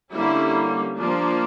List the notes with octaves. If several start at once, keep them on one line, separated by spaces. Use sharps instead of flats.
D3 G3 A#3 C#4 E4
F3 A#3 D4